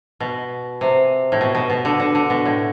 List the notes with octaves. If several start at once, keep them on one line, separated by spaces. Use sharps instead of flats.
B2
C3
A2
B2
B2
B2
D3
D3
D3
B2
A2